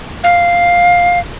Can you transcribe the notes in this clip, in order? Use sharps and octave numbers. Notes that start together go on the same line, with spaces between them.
F5